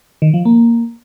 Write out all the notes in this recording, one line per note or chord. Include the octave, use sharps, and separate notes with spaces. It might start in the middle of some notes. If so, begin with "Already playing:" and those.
D#3
F3
A#3